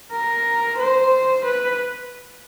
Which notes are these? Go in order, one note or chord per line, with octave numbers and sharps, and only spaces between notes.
A#4
C5
B4